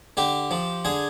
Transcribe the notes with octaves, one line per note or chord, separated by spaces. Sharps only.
D3 G4
F3
D3 G#4